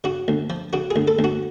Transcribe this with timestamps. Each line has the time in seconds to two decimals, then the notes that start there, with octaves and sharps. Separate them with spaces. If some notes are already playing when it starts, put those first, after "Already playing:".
0.04 C#3 F#4
0.28 D2
0.50 F3
0.73 C#3 F#4
0.91 G#4
0.96 D2
1.08 A4
1.19 D2
1.24 F#4